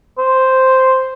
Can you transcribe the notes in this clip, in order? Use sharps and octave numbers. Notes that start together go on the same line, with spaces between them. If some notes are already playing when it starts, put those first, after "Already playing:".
C5